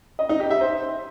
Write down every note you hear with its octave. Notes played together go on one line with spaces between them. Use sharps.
D#5
D#4
G4
E5
C5